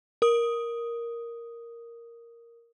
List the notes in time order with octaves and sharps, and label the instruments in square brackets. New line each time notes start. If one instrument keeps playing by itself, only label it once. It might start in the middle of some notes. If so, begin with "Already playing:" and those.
[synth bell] A#4 D#6